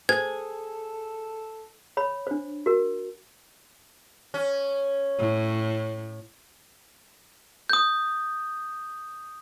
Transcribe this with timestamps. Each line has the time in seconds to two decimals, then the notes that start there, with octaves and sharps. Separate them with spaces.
0.09 G#4 A4 C5 G#6
1.97 C#5 B5
2.27 D4 C5
2.66 F#4 A#4
4.34 C#4
5.19 A2
7.70 D#6 G6